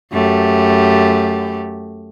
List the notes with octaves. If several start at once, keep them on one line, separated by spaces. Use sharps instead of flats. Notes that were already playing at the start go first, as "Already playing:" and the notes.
F#2 A3 G4